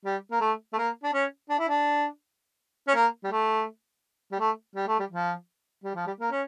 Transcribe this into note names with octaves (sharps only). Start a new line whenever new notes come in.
G3
A#3
A3
A3
A#3
D4
C#4
D4
E4
D4
C#4
A#3
G3
A3
G3
A3
G3
A3
G3
F3
G3
F3
G3
A#3
C#4